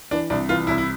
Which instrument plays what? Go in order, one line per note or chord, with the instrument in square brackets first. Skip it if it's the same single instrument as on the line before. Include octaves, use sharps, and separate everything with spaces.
[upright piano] E3 [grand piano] D4
[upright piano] C2 [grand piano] D4
[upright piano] E3 [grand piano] F4
[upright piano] C2 [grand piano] E4
[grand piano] E4